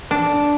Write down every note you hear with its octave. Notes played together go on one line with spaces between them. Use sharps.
D4